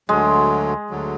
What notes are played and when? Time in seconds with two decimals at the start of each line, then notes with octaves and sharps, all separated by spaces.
0.09 D2 D3 F#3 G#3
0.90 D2 D3 F#3